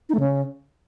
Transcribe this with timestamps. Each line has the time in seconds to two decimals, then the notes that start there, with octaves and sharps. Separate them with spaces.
0.09 D#4
0.14 A3
0.20 C#3